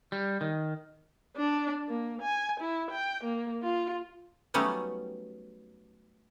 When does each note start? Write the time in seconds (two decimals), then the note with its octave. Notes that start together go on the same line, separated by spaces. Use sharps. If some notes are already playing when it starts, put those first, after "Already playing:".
0.12 G3
0.41 D#3
1.37 D4
1.89 A#3
2.22 G#5
2.60 E4
2.91 G5
3.24 A#3
3.63 F4
4.54 F#3 G3 A3 B3 C#4 D#4